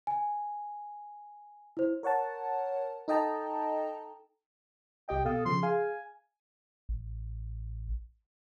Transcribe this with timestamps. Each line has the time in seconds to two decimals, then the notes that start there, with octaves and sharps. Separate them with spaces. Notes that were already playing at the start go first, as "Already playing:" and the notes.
0.07 G#5
1.77 E4 C5
2.03 A#4 C#5 F#5 A5
3.08 D#4 A4 D#5 G5 A5 A#5
5.09 C2 G4 D#5 G5
5.25 B2 A4 F5 D#6
5.46 C#3 F3 C6
5.63 G#4 F5 G#5
6.89 A1